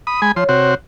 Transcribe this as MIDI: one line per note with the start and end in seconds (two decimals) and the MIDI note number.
0.07 0.21 83
0.07 0.21 87
0.22 0.32 56
0.22 0.32 80
0.22 0.32 83
0.36 0.44 53
0.36 0.73 73
0.36 0.44 84
0.49 0.75 48
0.49 0.75 66
0.49 0.75 72